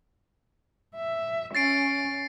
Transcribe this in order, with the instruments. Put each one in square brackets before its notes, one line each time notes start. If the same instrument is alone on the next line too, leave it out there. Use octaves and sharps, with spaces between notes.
[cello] E5
[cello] C#4 [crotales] A6 C7 D7